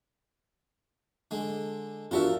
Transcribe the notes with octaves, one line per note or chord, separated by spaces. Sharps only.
D3 G#3
F3 D4 F4 F#4 A#4 E5